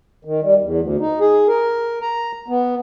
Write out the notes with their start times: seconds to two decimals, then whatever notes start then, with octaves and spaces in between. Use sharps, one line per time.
0.25 D#3
0.43 G3
0.61 E2
0.81 D2
1.00 D#4
1.20 G#4
1.48 A#4
2.02 A#5
2.48 B3